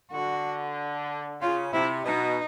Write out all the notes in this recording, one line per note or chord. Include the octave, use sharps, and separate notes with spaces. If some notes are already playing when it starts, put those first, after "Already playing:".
D3 F#4
C#3 F4
C3 E4
B2 D#4